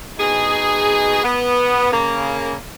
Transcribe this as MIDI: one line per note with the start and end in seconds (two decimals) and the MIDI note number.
0.19 1.22 47
0.19 1.22 63
0.19 1.22 68
1.24 1.91 59
1.91 2.55 49
1.91 2.55 58